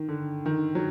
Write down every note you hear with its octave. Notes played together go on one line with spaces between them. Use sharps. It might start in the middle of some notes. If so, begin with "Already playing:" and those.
Already playing: D#3
D3
D#3
F#3